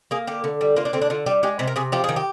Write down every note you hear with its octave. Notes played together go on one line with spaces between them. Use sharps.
A#3 G#4
D3 G4
D3
G3
A#3 F4
D4
D3 C4
D4
D3 F4
G3 G4
G#3 G4
C3 C5
A#4
C3 G#4
F3 G4
D#3 G#4
G4